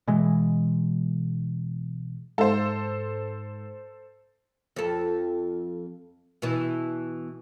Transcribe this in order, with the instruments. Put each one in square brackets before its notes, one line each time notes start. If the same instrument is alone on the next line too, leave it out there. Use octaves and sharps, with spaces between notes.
[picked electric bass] B2 E3 G#3
[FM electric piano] G#2 [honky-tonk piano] A4 C5
[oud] F2 A4
B2 E3